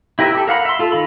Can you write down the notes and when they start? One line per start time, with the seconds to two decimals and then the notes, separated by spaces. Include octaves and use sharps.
0.19 E4 G4 A#4 B4 E5
0.35 G4 A4
0.47 A#4 F5 F#5 B5
0.65 E5 C6
0.79 F4 A4
0.92 D#3 F4 B5